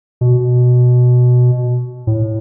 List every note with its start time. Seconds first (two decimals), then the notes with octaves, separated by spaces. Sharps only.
0.21 B2
2.07 A2